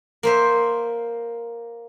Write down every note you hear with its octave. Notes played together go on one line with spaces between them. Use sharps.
A#3 C5 E5